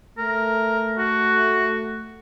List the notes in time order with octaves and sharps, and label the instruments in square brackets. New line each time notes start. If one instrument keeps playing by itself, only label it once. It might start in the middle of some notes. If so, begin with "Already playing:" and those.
[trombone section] A3 [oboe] A#4
[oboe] F#4